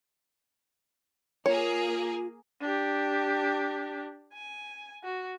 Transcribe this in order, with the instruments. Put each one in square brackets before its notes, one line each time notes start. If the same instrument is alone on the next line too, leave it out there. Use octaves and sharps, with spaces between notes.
[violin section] A#3 G#4 [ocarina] F4 [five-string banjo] C#5
[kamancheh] D4 G4
G#5
F#4